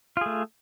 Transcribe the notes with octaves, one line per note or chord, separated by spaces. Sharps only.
A3 F4 G#4